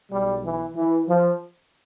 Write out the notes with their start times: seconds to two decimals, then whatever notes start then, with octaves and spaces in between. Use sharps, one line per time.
0.12 B1 B2 G3
0.44 E3
0.77 E3
1.09 F3